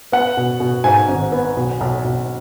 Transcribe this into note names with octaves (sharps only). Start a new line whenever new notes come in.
B3 F#5
B2
B2
G#2 G#5
G#1
B3
B1
B1
B1